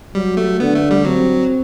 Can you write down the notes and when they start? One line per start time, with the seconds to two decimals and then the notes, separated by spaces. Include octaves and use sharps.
0.15 F#3 G3
0.37 A3
0.60 D3 B3
0.75 A3
0.91 G3
1.05 F#3 C4